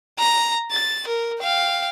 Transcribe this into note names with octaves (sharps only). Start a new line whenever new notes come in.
A#5
A6
A#4
F5 G5